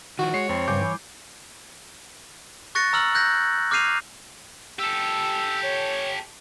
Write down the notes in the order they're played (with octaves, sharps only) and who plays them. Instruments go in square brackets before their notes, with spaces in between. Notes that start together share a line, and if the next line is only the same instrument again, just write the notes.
[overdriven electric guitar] D#3 F3 [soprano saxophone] F#4
[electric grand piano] G#3 C7 [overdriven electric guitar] C#5
[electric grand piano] F2 [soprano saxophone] C4
[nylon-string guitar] G2 C#3 F5 [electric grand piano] G#5 D6 G6
[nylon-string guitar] E3
[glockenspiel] C#6 F#6 A6 A#6 C#7
A#5 E6 F6 F#7
F#6 G6 A#6
D6 F6 G6 C7 D#7 F7
[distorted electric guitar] G4 A4 [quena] E6
[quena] C#5